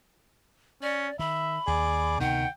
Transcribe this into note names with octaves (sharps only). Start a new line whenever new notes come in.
C#4 D5
D#3 E5 B5
D#2 G#4 D5
D2 C3 D#3 B3 F#5 G5